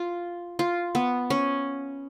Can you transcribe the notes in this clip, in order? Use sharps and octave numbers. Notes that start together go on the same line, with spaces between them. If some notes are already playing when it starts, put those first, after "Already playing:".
Already playing: F4
F4
B3
C#4